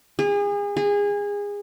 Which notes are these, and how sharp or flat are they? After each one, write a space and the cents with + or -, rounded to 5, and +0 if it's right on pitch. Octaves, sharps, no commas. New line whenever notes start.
G#4 -35
G#4 -25